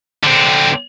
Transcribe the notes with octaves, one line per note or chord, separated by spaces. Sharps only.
D3 C4